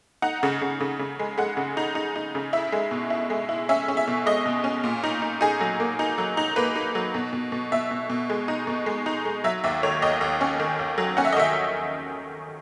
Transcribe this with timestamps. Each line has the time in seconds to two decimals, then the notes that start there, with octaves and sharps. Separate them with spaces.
0.22 D#4 F#5
0.43 C#3
0.61 C#3
0.80 C#3
0.99 C#3
1.19 G#3
1.38 G#3 F#5
1.57 C#3
1.77 D#4
1.95 D#4
2.16 D#4
2.35 C#3
2.53 E4 E5
2.72 G#3
2.91 B2
3.10 E4
3.30 G#3
3.49 E4
3.69 C#4 E5
3.88 C#4
3.97 E5
4.07 B2
4.26 G#3 D#5
4.46 B2
4.64 C#4
4.84 A#2
5.03 D#4
5.22 D#4
5.41 D#4 G#4
5.60 F#3
5.80 A#3
5.99 D#4
6.18 F#3
6.37 D#4
6.56 A#3 B4
6.75 D#4
6.95 F#3
7.14 B2
7.33 B2
7.52 B2
7.72 B2 E5
7.91 B2
8.10 B2
8.29 G#3
8.48 D#4
8.67 B2
8.86 G#3
9.06 D#4
9.25 G#3
9.44 F#3 E5
9.64 D#2 E5
9.83 D#3 C#5
10.02 D#2 D#5
10.21 D#2
10.41 C#4
10.60 D#3
10.79 D#2
10.98 F#3
11.17 C#4 F#5
11.25 E5
11.32 D#5
11.37 D#3 E5